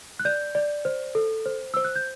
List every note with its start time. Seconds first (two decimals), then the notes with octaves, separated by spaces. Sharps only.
0.19 F#6
0.25 D5 G6
0.55 D5
0.85 C5
1.15 A4
1.46 C5
1.74 C5 E6
1.85 F#6
1.96 G6